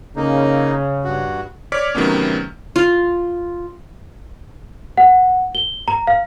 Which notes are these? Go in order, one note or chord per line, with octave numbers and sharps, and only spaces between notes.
C#3 A#3 D#4
G2 F#4
C#5 D5 D6 F6 B6
C3 D#3 F#3 A3 B3 C#4
F4
F#5
G7
A#5
F5